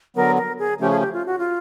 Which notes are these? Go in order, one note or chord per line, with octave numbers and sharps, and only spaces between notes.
D3 F#3 B3 A#4
A#4
G#4
C#3 F3 A3 C#4 G4
G#4
G4
F4
F#4
F4